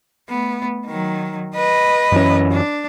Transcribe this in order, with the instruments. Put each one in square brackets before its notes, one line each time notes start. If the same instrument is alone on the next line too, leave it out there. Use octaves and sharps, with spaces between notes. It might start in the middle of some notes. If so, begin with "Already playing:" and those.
[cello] A3 B3
D#3 F#3
B4 D#5
[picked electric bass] F#2 E3 C#4
[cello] D4